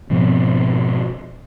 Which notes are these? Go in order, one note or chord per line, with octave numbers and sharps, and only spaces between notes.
G#2 B2 F3 C4